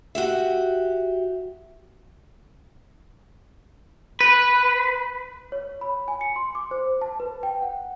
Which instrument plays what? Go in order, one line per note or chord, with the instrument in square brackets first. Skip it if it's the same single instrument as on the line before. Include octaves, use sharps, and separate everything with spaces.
[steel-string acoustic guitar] F#4 G4 E5
[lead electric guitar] B4
[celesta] C#5
B5
G#5
C#7
C6
D6
C5
A5
B4
G5
F#5